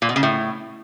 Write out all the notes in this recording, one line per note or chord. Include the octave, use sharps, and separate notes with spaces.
A#2
B2
C#3
A2